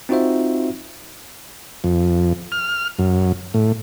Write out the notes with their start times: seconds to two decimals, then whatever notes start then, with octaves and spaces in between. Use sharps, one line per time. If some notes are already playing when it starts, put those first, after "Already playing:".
0.09 C4 D#4 F4 F#4 C5 E5
1.84 F2
2.52 F6
2.99 F#2
3.54 A2